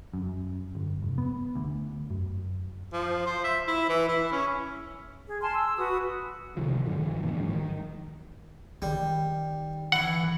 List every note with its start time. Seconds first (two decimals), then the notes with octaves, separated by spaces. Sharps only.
0.13 F#2
0.75 G1
1.02 F1
1.18 B3
1.55 D2
2.10 F#2
2.93 F3
3.27 C5
3.44 E5
3.67 E4
3.89 E3
4.09 E4
4.32 C#4
5.27 G#4
5.42 G#5 A5 C6 F6
5.54 E6
5.77 F#4 B4 D#6
6.57 C#2 C3 D#3 F3
6.85 G2 B2 D3 F#3
6.98 D#3 F3
7.23 F#2 A#2 D3 E3
7.36 D#1 G#2 F#3
7.53 D#3
8.82 D#3 G3
9.92 E3 F#5